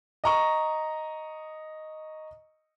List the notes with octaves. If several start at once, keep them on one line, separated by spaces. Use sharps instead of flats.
D#5 A#5 C#6